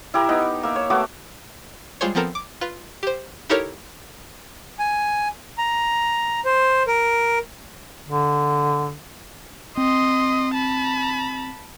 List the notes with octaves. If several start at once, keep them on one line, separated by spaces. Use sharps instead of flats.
E4 G4 A#4
B3 D#4
A#3 E5
C#5
A3 B3 F#4 D6
G3 G#3 F4 G#4 C5 C#5
F3 B3 C4 A4 A#4
D6
F4 B4
G4 C5
D#4 E4 G4 A4 A#4 C#5
G#5
A#5
C5
A#4
D3
C4 D#5 C6
A5 B5